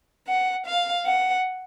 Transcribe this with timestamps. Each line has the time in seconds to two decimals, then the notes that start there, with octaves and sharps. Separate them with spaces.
0.27 F#5
0.65 F5
1.06 F#5